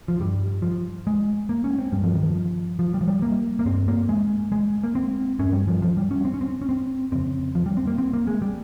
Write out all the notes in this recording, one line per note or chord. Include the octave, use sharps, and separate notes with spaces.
F3
G2 G3
F3
G#3
A#3
C#4
C4
G2 G3
F3
D#3
F3
F3
G3
F3
G3
A#3
A#3
G2 C4
A#3
G#3
G#3
A#3
C4
G2 C#4
G3
F3
F3
G3
C#4
C4
C#4
C4
C#4
C4
F2 C#3 C4
F3
G3
C4
A#3
C4
A#3
G#3
G3